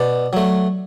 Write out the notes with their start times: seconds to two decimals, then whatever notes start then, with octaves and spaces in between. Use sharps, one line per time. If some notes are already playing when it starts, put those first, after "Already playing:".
Already playing: B2 D5
0.33 F#3 A3